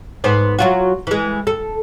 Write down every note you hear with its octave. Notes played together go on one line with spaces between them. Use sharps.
G#2 B3 C5
F#3 F4 F#4
E3 G#3
A4